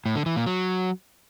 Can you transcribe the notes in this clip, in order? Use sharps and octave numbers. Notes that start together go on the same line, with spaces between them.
A2
D3
E3
A#2
F#3